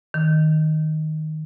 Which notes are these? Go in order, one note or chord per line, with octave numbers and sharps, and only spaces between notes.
D#3